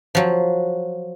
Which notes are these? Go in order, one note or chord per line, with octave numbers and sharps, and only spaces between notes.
F3 F#3